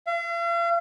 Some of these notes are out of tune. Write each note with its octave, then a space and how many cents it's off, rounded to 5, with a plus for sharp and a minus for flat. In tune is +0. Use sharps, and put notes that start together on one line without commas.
F5 -45